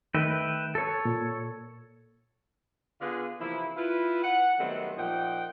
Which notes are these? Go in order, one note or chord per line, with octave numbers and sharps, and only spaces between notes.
D#3 A3 B4 E5 G5
A4 C#5
A#2
D3 B3 F4 G#4
C3 E3 F3 A#3 E4
E4 F4 B4
F#5
D#3 F#3 G3 A3 B3 C4
A#2 F3 D#4 F#5 G5